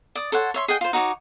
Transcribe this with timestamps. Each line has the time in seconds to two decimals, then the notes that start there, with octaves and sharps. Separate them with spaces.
0.15 D5 D#6
0.32 A4 C5 C#5 F#5
0.54 C#5 E5 C6
0.68 G#4 D#5 F#5 G5
0.81 F4 C5
0.93 D#4 F#4 C#5 D6